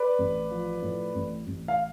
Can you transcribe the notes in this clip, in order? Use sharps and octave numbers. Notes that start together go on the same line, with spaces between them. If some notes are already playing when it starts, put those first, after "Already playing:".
Already playing: B4 D5
A1
F3
A2
A1
A1
F5